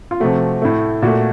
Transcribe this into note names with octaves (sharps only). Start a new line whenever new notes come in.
F4
C3 F3 A3 F#4
A2 A3
A#2 A3 F#4